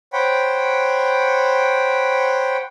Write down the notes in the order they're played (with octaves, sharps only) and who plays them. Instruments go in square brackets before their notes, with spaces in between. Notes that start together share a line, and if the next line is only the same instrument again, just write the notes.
[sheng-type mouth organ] C5 C#5 F#5 G5 B5